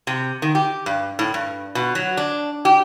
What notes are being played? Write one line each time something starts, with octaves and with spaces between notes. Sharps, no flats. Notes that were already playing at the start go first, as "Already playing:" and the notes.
C3
D#3
G4
G2
A2
G2
B2
F#3
D4
G4